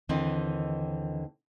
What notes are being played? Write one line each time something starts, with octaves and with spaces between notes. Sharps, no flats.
D#2 D3 E3 C4 D#5